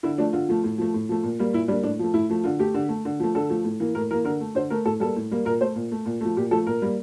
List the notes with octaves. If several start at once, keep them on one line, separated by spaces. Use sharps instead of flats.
D3 E4
F3 A3 D4
D3 F4
F3 A3
A2
F3 A3
A2
F3 A3
A#2
G3 A#3
A#2 E4
G3 A#3 D4
A2 D4
F3 A3
A2 E4
F3 A3
D3 F4
A3 G4
D3
A3
D3
F3 A3
D3 A4
F3 A3
A2
E3 A#3
A2 A#4
E3 A#3 A#4
D3 A#4
A3
D3 C5
A3 A#4
A2 A4
G3 A#3 A4
A2
G3 A#3
A#2 A#4
A3 C5
A#2
A3
A#2
F3 A3
A#2 G4
F3 A3 A4
A#2 A#4
G3 A#3